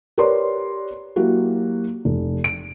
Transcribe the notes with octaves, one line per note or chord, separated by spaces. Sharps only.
G4 A#4 B4 C#5 D5 C6
F#3 A#3 E4 F#4 G4
F1
D7